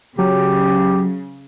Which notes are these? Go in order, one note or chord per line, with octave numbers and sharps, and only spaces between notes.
C#3 F#3 G4